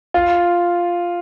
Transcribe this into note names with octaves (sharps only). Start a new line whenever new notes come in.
F4